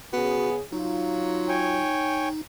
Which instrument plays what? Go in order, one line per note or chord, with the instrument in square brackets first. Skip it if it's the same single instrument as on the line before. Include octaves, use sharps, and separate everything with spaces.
[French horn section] C#3 G#4 [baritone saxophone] B3 [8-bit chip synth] F#4
[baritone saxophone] F#3 [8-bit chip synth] D#4 [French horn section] F4
[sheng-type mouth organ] C#5 G5 G#5